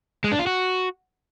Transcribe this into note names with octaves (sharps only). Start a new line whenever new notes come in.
G#3
D4
F4
F#4